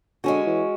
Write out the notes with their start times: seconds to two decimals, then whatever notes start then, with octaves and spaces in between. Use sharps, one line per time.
0.24 D3 G#3 C#4 F#4
0.46 E3